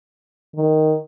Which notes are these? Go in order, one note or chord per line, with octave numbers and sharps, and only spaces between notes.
D#3